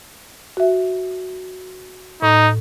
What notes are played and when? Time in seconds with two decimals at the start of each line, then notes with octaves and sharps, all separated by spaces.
0.57 F#4 E5
2.22 A2 D#4